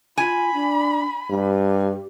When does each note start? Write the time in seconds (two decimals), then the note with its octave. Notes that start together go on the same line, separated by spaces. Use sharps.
0.18 F4 G#5 B5
0.54 D4
1.30 G2 G4